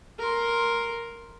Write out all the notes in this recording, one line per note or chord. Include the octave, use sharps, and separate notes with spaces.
A#4 C6